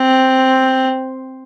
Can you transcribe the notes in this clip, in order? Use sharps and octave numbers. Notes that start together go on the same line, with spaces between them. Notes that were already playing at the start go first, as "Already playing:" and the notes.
Already playing: C4